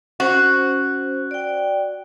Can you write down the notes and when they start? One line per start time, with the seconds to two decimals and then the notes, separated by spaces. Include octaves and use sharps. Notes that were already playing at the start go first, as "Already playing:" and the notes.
0.20 C#4 F#4 C5
1.31 D5 G5